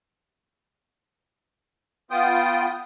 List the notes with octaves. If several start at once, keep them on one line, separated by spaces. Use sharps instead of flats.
B3 F4 G5 D#6